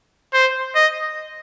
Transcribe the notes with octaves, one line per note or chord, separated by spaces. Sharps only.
C5
D#5